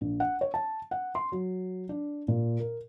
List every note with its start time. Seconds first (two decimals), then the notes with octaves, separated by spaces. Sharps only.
0.01 A#1
0.20 F#5
0.41 C#5
0.54 A5
0.91 F#5
1.15 C6
1.32 F#3
1.89 D4
2.28 A#2
2.60 A#4